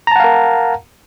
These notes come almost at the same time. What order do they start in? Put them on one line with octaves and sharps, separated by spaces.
A#5 A5 F#5 F5 A#4